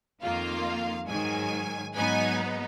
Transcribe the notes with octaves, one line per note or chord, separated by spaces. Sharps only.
F2 D#3 A#3 F4 F5
G#2 D#3 F#3 G#5
G#2 F#3 B3 D#4 G#5